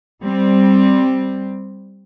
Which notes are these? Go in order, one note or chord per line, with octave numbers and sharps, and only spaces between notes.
G3 C4